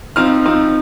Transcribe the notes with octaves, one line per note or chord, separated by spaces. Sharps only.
F3 C4 D#4 F6
F3 C4 D#4